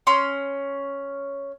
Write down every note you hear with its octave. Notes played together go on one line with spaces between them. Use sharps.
C#4 C6